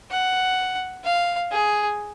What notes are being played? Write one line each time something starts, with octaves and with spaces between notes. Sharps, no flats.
F#5
F5
G#4